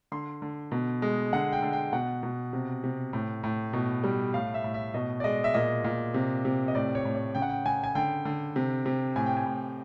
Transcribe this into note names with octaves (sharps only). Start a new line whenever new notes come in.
D3 C6
D3
B2
G#3
D3 F#5
G5
D3
G5
B2 F#5
B2
C3
C3
A2
A2
B2
G3
A2 F5
E5
A2
E5
B2 D#5
D5
G#3 D#5
E5
A#2 D#5
A#2
C3
C3
D#5
A2 D5
C#5
A2
C#5
C#3 G5
F#5
G5
C#3 G#5
G#5
D3 G5
D3
C3
C3
A2 G#5
G5
G#5
A2